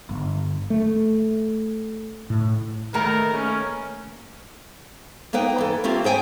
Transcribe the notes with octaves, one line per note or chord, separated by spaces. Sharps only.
G1
A3
A2
D#3 A3 A#3 A#4 B4 A#5 B5
C#4 B4
A#3 B3 D#4 B4 G5
E3 A4
A3 A#3 C4 F4 G4
G#4 C5 G5 G#5